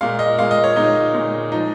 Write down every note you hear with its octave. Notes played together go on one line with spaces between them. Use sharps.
A#2 G#3 F5
D#5
A#2 G#3 F5
D#5
C#5
A#2 G#3 D#4
A#2 G#3
F3 G#3 D#4